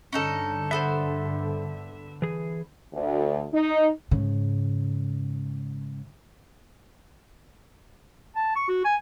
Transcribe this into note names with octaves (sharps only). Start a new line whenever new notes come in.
G2 D3 C#4 D#4 A4
B3 A4 C5 E5
E3 G#4
D2
D#4
G#2 C#3
A5
C#6
F#4
G#5